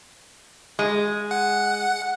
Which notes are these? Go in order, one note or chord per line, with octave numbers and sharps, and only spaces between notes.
G#3
F#5